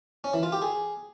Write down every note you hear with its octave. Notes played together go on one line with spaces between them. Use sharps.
C#4
E3
F4
G4
G#4